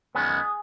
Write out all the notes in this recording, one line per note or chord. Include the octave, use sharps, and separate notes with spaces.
F#2 D#3 G#3 B3 G#4